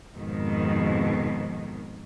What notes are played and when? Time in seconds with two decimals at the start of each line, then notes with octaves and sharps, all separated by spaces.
0.14 F2 G#2 B2 D#3